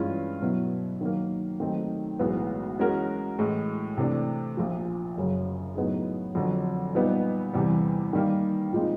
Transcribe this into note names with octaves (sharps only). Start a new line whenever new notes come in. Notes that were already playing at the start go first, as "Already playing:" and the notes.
Already playing: G2 E3 G#3 C#4 F4
B2 F#3 B3 E4
D#3 F#3 A#3
D#3 F#3 A3 C4 D#4
B1 A2 E3 G#3 B3
E3 G#3 C#4 F#4 A#4
A2 E3 G#3
C3 E3 A3 D4
A#1 A#2 F3
F#1 F#2 C#3 F#3
A2 F#3 B3 D#4 G#4
F2 D3 F#3
A#2 G3 B3 D#4
E2 C3 E3 G3
D#3 G3 A#3
A#2 F3 G#3 C4 D#4